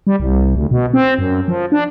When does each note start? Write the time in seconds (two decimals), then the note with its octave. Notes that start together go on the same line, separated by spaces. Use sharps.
0.07 G3
0.20 C2
0.56 D2
0.71 B2
0.94 C4
1.19 F#2
1.48 F3
1.72 D4